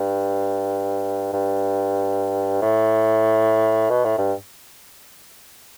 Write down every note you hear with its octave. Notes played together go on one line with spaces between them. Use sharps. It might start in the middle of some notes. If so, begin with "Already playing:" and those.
Already playing: G2
G2
A2
B2
A2
G2